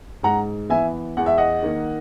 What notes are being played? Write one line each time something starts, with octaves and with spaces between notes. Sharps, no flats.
G#2 F#5 A#5
E3 B3 E5 G#5
E2 F#5
E5
D#5 F#5
D#3 A#3